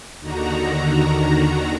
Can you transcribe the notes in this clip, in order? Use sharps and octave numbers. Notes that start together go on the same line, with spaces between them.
D#2 D3 D#3 F#4 A#5